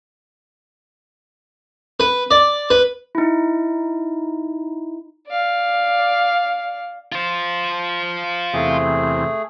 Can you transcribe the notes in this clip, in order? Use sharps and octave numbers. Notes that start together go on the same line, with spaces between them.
B4
D5
B4
D#4 E4
D5 F5
F4 C5
E2 C3 A3 G#4